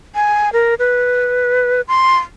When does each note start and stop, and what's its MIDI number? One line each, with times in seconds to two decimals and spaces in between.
0.15 0.52 80
0.53 0.75 70
0.79 1.81 71
1.88 2.17 84